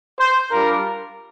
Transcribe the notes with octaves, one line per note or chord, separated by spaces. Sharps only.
C5
G3 D4 F4 A#4